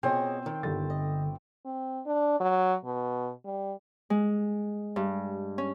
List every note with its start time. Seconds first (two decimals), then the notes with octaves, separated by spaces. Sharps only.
0.03 B2 B3 C4 F4 G#4 C#5 D#5
0.46 D#3 G5
0.63 G1 D3 G4 A6
0.90 D#5
1.65 C4
2.06 D4
2.40 F#3
2.85 B2
3.45 G3
4.10 G#3
4.96 G2
5.58 C#4